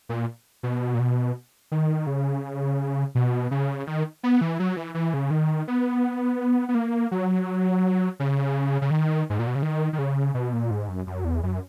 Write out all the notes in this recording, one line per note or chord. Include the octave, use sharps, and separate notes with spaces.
A#2
B2
A#2
B2
D#3
C#3
B2
C#3
D#3
B3
E3
F#3
E3
E3
C#3
D#3
B3
B3
A#3
F#3
C#3
C#3
D#3
G#2
A#2
B2
C#3
D#3
D#3
C#3
B2
A#2
G#2
F#2
F#2
E2
F#2